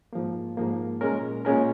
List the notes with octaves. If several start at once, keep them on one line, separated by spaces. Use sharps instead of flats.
G#2 F3 A#3
G#2 F3 A#3
A#2 G#3 C#4 A#4
A#2 G#3 C#4 A#4